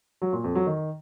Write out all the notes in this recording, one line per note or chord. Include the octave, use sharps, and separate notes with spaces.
F#3
A#2
F2
F#3
D#3